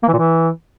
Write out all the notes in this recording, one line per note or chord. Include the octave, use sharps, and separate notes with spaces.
A#3
E3
A#2
E3